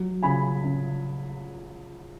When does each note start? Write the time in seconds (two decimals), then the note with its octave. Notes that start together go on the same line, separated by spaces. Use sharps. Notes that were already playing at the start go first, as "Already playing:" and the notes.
Already playing: F#3
0.22 C#3 G#5 B5
0.63 C#3